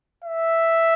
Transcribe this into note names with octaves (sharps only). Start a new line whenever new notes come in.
E5